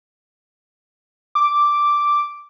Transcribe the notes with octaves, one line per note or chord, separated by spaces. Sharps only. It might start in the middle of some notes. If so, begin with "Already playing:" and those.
D6